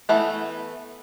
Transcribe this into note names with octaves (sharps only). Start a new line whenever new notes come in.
E3 A3 B3